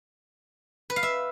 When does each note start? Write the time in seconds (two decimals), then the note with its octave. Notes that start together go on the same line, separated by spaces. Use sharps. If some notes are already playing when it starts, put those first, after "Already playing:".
0.90 B4
0.96 F5
1.03 E5